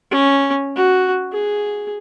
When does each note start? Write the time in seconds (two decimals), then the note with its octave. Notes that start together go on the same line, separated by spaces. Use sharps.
0.11 C#4
0.76 F#4
1.32 G#4